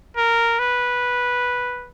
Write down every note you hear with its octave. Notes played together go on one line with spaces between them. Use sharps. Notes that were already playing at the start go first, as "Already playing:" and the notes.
A#4
B4